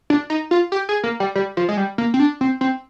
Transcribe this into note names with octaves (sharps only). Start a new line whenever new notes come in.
D4
D#4
F4
G4
G#4
A#3
G3
G3
F3
G#3
G3
A#3
C4
D4
C4
C4